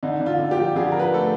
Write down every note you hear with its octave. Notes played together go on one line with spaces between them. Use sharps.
D3 D#4
D3
F4
D3
G4
F3
D3 G#4
F3 A#4
B4
A3 A4